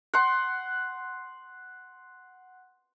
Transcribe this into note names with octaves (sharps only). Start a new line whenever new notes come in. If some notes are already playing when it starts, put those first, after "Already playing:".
F#5 C6